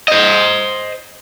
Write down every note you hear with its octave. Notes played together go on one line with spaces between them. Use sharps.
C5 D#5